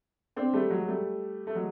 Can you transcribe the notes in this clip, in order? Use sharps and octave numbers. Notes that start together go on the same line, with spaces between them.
C4 D4
G3 A3
F#3 G#3
G3 A3
A3
F#3 G#3